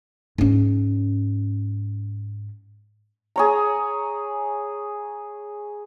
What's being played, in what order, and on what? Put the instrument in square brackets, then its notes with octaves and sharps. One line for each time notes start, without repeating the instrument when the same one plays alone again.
[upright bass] G#2 C#4
[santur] G#4 C#5 A#5